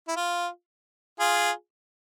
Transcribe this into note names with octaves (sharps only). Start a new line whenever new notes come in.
E4
F4
F4 G#4